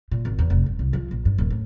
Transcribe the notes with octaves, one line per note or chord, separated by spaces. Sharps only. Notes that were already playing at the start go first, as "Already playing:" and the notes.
A#2
G#1
E2
F1
G2
C2
F3
A#1
G2
D#1
A2